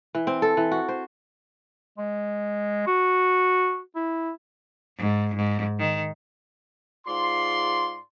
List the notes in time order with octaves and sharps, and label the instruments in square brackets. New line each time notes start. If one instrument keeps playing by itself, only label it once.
[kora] E3
C4
A4
E3
F#4
C5
[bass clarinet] G#3
F#4
E4
[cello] G#2
G#2
D#3
[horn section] G#2 F4 D5 C6